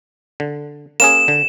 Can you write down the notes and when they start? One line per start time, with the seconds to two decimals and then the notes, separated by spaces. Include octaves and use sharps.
0.40 D3
1.00 A#3 C#4 G#4 E7
1.28 D3